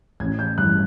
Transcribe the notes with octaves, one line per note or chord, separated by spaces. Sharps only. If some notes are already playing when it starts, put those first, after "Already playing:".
A1 G#6
G6
G2 E3 F#6